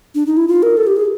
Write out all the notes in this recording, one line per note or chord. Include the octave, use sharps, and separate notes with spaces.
D4
D#4
E4
F4
A#4
A4
G4
G#4